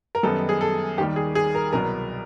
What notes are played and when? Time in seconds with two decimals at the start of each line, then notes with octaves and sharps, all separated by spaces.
0.15 A#4
0.23 F#2 D#3 G3 B3 D#4 A4
0.49 G#4
0.61 A4
0.98 D#2 D#3 G3 G4
1.16 G#4
1.35 G#4
1.55 A#4
1.73 C2 B2 F#3 B3 A#4